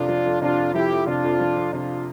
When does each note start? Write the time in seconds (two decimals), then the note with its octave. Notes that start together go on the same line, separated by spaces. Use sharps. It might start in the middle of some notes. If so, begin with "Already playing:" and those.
Already playing: F2 C3 D4 F4
0.09 F3
0.26 F2
0.42 C3 D4 F4
0.58 F2
0.74 F3 E4 G4
0.91 F2
1.07 C3 D4 F4
1.24 F2
1.40 F3
1.56 F2
1.73 C3 D4 F4